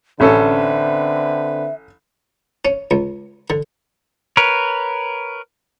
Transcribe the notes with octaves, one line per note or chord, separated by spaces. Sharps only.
A1 D3 C4 C#4 A4 B4 E5
C#4
C#2
D3
A#4 B4 C#5